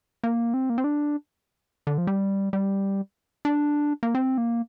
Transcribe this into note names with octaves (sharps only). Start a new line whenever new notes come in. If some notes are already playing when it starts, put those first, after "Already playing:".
A#3
C4
A#3
C4
D4
D3
F3
G3
G3
D4
A#3
C4
A#3